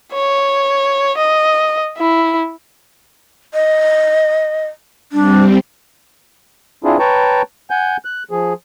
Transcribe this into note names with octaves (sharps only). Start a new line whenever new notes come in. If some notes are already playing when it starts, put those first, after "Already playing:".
C#5
D#5
E4
D#5
G3 C4 D4
C4 D4 E4 F4 G#4
B4 C#5 G5 A5 A#5 C#6
F#5 G#5 G6
F#6
F3 G#4